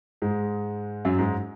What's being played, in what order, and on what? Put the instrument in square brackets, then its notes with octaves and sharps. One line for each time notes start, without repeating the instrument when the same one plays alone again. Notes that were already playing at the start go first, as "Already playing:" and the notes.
[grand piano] G#2 G#3
F#2 F#3
G#2 G#3